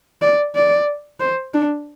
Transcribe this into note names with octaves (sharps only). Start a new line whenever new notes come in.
D5
D5
C5
D4